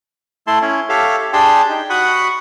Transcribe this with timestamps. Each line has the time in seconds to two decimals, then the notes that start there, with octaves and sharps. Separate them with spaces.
0.47 A3 E4 A5 C6
0.62 C#4 E4 C#5
0.89 G4 A4 C#5 E5 F5
1.33 D4 G4 G#4 G5 A5 C6
1.70 D#4
1.90 F#4 F#5 B5 C#6 D#6